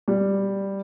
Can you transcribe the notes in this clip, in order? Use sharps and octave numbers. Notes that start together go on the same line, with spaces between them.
G3